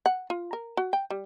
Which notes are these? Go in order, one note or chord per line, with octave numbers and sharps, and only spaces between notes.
F#5
F4
A#4
F#4
G5
G3